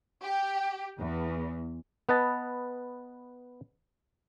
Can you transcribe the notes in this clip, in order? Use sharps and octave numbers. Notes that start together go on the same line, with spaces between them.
G4
E2
B3 B4 D#5 A5